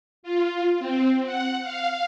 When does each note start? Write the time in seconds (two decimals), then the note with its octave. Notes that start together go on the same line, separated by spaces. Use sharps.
0.23 F4
0.79 C4
1.25 F#5
1.63 F5